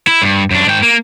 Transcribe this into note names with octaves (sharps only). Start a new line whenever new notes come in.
E4
G2
F#2 D4
G#2 G5
A#3